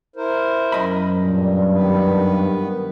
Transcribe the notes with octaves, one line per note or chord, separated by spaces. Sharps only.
E4 A#4 C5
F#2 D#5 B5
G2 A#2
D#3 B3 B4